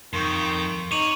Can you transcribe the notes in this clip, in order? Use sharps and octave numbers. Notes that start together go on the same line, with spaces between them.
F2 D#3 C6 C#6 G6
D#4 C#5 C#6 D6 D#7 F#7